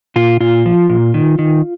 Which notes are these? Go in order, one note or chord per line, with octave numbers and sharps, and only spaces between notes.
A#2 F4
A#2 F4
F3
A#2
D#3
D#3